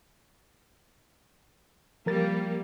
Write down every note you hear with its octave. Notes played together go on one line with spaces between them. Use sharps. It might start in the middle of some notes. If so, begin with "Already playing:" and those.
F3 G3 A#3 A#4 A6